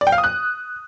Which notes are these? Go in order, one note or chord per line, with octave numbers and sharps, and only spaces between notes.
D5
G5
F5
D#6
F#6